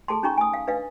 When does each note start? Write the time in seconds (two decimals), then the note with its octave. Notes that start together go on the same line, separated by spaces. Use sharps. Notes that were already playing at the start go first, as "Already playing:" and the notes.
0.08 G#4 A4 A5 C6
0.23 C#4 D#4 G#4 A#5 C#6
0.37 G#5 D#6
0.54 F5
0.67 D4 B4 D#5 F5